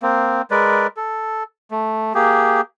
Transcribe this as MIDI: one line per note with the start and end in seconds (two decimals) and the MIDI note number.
0.03 0.42 58
0.03 0.42 60
0.51 0.87 56
0.51 0.87 70
0.51 0.87 71
0.51 0.87 74
0.97 1.43 69
1.71 2.13 57
2.15 2.61 58
2.15 2.61 67
2.15 2.61 68